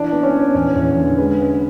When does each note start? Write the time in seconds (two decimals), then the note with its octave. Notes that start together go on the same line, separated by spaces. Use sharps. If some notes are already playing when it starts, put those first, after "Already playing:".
Already playing: E3 D4 D5
0.12 B3
0.23 C#4 C#5
0.34 B3
0.55 E2 C#4 C#5
0.76 E2
0.97 D3
1.18 G#3 B4
1.39 C#4 B4